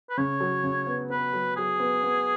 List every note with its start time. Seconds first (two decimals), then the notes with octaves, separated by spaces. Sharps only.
0.10 B4
0.17 C#3 C#5
0.40 F#3
0.63 C#3
0.87 B3
1.10 B3 B4
1.33 F#3
1.56 F#3 G#4
1.79 B3
2.03 B3